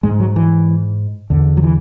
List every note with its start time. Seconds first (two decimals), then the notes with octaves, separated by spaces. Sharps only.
0.03 G#2 G#3
0.20 F#3
0.36 E3
1.30 E2 D3
1.57 F#3
1.63 E3